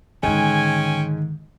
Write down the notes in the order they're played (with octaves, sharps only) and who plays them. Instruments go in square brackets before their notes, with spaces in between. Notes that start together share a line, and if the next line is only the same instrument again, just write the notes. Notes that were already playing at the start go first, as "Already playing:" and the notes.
[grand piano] G#2 G#3 [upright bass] D3 D#3 [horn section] C#4 G5 G#5